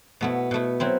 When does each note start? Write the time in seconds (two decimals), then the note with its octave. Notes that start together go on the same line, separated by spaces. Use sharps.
0.21 B2 A3 B3 E4
0.51 B2 A3 E4
0.80 F#3 C4 E4